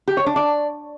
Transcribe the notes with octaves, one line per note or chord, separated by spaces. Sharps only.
G4
C#5
D4
D5